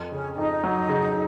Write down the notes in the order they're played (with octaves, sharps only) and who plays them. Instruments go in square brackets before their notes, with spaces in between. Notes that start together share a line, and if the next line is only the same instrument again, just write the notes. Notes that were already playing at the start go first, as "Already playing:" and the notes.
Already playing: [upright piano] F2
[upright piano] C#3 [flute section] C#4
[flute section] C#4
[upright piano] F2 [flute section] D#4
[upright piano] F#3
C#3